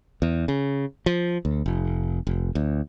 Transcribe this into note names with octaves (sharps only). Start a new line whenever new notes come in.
E2
C#3
F3
D2
F1
F1
D2